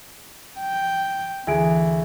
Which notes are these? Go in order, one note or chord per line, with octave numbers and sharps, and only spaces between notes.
G5
D2 E3 G#4 D7